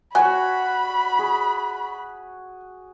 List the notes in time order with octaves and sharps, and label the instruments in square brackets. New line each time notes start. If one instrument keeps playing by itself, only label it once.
[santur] F#4 C#5 [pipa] G#5 [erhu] B5
[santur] G#4